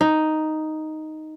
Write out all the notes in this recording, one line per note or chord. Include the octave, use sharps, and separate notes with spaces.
D#4